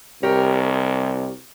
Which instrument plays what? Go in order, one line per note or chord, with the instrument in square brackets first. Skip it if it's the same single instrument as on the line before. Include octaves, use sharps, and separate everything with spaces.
[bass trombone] C2 [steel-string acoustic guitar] G4 A#4 C#5